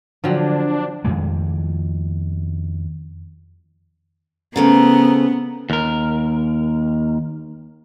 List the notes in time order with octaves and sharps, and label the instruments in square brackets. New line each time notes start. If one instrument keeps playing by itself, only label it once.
[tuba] D3 [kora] F3 F#3 C4 [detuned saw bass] D4
[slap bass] F2 D#3 G#3
[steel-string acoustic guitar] C#3 A3 C4 [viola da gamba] B3 [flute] A#5
[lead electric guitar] D#2 A#4